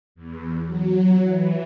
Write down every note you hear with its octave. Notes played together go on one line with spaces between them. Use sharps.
E2
F#3
E3